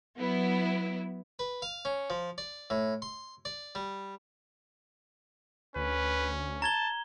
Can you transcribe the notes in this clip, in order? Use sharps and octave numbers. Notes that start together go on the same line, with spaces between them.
F#3 B3 E4
B4
F5
C#4
F3
D5
A2
C6
D5
G3
D2 C#4 B4
A5 A#5 G#6 G7